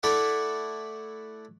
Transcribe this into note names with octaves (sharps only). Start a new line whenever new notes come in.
A3 E4 A4 D5 E5 F#5